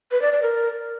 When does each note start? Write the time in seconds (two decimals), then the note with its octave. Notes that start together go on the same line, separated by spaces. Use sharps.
0.11 B4
0.22 D5
0.32 D5
0.42 A#4